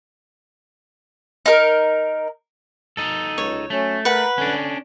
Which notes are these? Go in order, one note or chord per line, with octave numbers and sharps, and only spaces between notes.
D#4 A#4
D#4 A4
C#2 C#5
F#3 A3 C#4
A#4 B4 F#5 B5
D3 C#4 D4